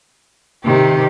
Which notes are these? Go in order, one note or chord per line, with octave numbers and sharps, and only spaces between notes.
C3 D#3 G4